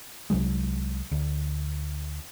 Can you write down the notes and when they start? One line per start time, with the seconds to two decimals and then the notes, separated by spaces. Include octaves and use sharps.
0.30 C2 C3 F#3 G#3
1.12 D2